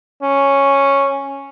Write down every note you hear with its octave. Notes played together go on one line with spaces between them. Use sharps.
C#4